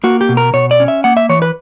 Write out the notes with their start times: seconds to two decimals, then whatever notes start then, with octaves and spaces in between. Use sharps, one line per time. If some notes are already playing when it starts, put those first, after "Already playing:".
0.04 A#3 F#4
0.21 G4
0.29 B2
0.37 A#4
0.54 B2 C#5
0.71 D5
0.80 C#4
0.88 E5
1.04 A#3 F#5
1.17 E5
1.29 E3 C#5
1.42 B4